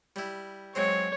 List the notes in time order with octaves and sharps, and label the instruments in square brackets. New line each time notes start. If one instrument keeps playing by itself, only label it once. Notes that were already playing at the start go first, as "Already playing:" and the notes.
[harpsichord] G3 E4
[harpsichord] F#3 G#3 C4 [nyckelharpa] C#5